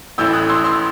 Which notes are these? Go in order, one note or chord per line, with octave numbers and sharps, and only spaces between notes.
A1 A2 E3 E6 G6
D#6 F#6
C6 E6
C6 E6